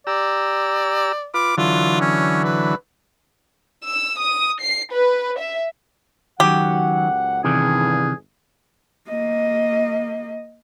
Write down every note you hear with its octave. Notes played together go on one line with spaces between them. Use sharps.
G4 D5 A#5 E6
F4 B4 D6
D3 E3 F#3 F4
C#4
B4
E6
D#6
C7
B4
E5
C#2 F#2 D#3 F#3 G4 F#5
G1 E2 G2 C3 D#3 E3 G#4
A#3 D#5